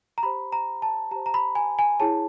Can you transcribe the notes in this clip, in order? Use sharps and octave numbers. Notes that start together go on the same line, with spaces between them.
A#5
G4 C5 B5
A#5
A5
G4 C5 A#5
A#5
B5
G#5
G#5
E4 G#4 C#5 A5